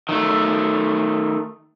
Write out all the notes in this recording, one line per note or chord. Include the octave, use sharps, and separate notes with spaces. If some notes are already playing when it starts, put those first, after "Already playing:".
D#3 A3